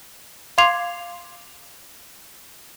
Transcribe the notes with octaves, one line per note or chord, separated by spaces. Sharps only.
F5 C6 D6 G#6 C7 F7